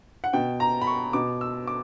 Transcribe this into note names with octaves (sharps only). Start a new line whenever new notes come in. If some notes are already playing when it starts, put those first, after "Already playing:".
F#5
B2 G5
A#5
B5
C#6
B2 D6
E6
D6